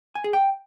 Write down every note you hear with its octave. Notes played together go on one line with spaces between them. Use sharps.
G#5
G#4
G5